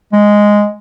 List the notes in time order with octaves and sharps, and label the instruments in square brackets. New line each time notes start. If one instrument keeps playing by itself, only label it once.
[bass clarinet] G#3